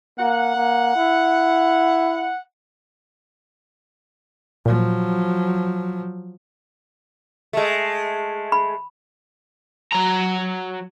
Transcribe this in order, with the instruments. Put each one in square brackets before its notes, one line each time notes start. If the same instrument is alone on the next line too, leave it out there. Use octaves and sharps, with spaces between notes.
[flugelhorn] A#3 [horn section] F#5
[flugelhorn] A#3
E4
[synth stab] A#2 [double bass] F3 F#3
[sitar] G#3 A3
[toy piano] B5
[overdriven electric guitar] F#3 A#5